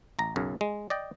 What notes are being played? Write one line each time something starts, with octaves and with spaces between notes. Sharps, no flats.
A1 A#5
B1 F#2 C#3
G#3
D5 D#5 G5